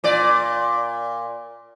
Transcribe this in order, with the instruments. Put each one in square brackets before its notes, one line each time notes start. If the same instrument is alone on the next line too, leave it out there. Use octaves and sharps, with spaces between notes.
[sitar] A#2 D5